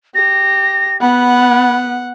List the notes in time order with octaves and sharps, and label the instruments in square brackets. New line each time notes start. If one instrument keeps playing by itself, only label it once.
[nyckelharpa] G4 [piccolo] A#6
[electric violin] B3 [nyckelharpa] F#5 [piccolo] B5